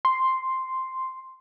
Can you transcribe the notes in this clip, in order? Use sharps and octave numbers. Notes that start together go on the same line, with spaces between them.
C6